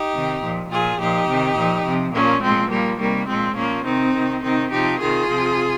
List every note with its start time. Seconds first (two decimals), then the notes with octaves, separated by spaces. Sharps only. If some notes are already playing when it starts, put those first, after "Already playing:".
Already playing: D#4 G4
0.14 C3 D#3
0.42 A#2 F3
0.71 A#2 F3 F4 G#4
0.99 A#2 F3 D#4 G4
1.27 C3 D#3
1.56 A#2 F3
1.86 C3 F3
2.13 A#2 F3 A#3 C#4
2.42 A#2 F3 G#3 C4
2.70 A#2 F3 G3 A#3
2.99 C3 D#3 G3 A#3
3.28 A#2 F3 G#3 C4
3.56 A#2 F3 A#3 C#4
3.85 C3 D#3 C4 D#4
4.14 C3 D#3
4.42 C3 D#3 C4 D#4
4.71 C3 F3 D#4 G4
5.00 C3 D#3 F4 G#4
5.28 C3 F3